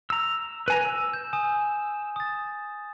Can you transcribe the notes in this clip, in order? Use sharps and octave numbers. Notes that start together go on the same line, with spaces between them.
A#5 E6
B4 G#5 A#5
E6
G6
G#5 D#6 E7
D#6 A6